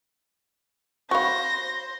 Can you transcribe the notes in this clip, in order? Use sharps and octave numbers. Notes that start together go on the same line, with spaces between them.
F#4 C5 F5 B5 C#6 A#6